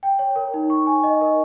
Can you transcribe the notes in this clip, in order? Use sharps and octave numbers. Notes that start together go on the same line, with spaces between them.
G5
C#5
A#4
D#4
C#6
G#5
D#5
A#4